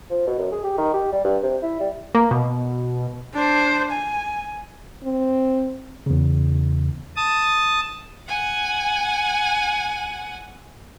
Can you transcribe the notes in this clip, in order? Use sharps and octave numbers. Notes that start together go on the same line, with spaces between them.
F3
B2
F#2
G#4
G4
D#3
G4
G3
G2
C3
E4
G3
A#3
B2
D4 C5
G#5
C4
E2 C#3
A5 D#6
F#5 G#5